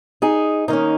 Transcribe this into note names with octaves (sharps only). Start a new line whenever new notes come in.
D#4 G#4
D#3 A#3 C#4 D#4